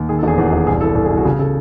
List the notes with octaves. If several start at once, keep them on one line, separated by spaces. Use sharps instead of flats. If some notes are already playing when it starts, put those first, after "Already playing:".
Already playing: D#2
D#3 G#4
A4
E1 G#4
E2
E1
C2 G#4
E3 A4
C2 A4
G#4
C2
F#4
C#3 G#4
C#3 A4